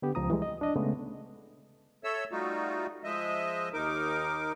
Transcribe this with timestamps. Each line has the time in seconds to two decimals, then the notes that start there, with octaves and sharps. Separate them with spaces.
0.02 D3 B3 G4
0.15 C#2 F3 A#5 D#6
0.30 E3 G3 G#3
0.42 D#5
0.61 D4 D#5
0.76 C#3 G#3 A3 B3
2.04 A4 C#5 E5 E6
2.31 G3 A3 D#4 F4 F#4
3.04 F3 G#3 D#5 E5
3.73 D#2 D#4 A#4 D6